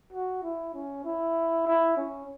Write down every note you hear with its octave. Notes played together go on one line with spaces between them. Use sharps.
F#4
E4
C#4
E4
E4
C#4